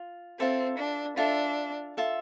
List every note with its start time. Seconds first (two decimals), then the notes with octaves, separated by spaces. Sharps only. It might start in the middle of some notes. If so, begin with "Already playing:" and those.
Already playing: F4
0.39 C4 F4 A4 E5
0.79 D4
1.17 D4 F4 A4 E5
1.97 F4 A4 E5